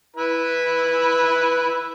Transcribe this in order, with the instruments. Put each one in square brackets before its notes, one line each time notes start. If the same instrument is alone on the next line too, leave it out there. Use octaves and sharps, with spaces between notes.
[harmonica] E4 B4 B5